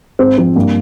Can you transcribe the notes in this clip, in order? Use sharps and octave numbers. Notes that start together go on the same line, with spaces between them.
G#2 C4
F3 C4
G2 A#3